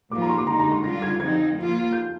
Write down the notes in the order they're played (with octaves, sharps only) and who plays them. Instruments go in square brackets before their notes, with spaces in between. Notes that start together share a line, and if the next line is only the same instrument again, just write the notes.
[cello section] A#2 F3 A#3 F4 [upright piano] D6
[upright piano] A#5
C6
D6
[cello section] D3 G#3 D#4 [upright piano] A#5
[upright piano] A#5
C6
[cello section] D3 G3 D4 F4 [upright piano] A#6
[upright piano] G#6
[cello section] F3 C4 D#4 [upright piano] G#6
[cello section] F3 A#3 F4
[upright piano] G6